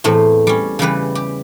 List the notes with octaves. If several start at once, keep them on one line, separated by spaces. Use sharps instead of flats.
E2 A2 A3 C4
G3 C#4
C#3 E3 G3 B4
G4